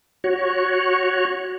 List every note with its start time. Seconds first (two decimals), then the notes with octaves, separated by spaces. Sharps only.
0.24 F#4 C#5